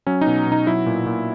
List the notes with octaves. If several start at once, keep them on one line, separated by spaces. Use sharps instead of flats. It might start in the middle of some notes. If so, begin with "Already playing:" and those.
F#3 C#4
D#4
B2
B2
D#4
F#3 E4
A#2
A#2